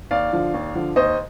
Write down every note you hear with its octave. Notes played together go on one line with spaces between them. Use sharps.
D#2 D5 F5
D3 F3
D#2
D3 F3
D#2 C5 D#5